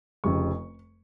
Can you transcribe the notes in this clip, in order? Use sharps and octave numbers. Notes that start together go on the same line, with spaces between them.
F1 F2 C#3 C#6